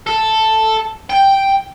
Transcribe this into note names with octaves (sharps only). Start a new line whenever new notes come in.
A4
G5